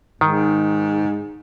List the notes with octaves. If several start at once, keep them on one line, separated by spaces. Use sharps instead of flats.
G#2 D#3